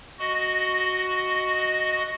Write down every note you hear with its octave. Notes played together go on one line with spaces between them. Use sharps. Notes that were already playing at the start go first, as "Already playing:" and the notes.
F#4 D#5